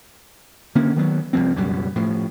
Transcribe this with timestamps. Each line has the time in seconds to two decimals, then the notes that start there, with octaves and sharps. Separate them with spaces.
0.75 D3 A#3 C#4
0.96 D#3 F#3 B3
1.33 C2 F2 F3 C4
1.56 C#2 F#2 B2 G3
1.96 A2 F3